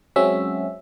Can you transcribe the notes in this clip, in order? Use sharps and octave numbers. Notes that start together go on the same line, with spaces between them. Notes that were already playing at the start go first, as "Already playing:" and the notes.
F#3 G#3 C4 C#4 F#4 E5